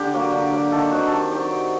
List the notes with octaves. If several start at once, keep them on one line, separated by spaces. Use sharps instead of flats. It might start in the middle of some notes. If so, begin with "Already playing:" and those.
Already playing: D3 G4
F#3 A#3
D3
F#3 A#3
D#3 A4
F#3 C4 D#4 F#4
D#3 G4 A4
F#3 C4 D#4 G4
F#3